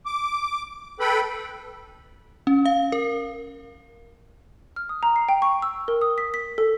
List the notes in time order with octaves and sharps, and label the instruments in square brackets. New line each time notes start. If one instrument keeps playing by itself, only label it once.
[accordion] D6
A4 B4 G5 B5
[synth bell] C#4
F5
A#4
[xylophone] F6
D#6
A#5
C7
G5
C#6
E6
A#4
D#6
B6
B6
A4